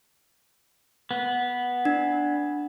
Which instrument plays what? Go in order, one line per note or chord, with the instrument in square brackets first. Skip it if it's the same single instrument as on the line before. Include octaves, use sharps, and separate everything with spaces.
[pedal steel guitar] B3
[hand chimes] D4